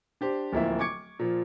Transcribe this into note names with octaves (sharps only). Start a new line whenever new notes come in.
D4 G4 C5
D1 F3 A#3 E4 E5
C#6 D6 G#6 C#7
A#2 F3